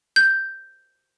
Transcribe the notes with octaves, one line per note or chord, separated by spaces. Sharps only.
G6